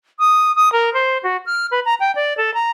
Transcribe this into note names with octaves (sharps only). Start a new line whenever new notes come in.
D#6
D#6
A#4
C5
F#4
F6
B4
A#5
G5
D5
A4
A#5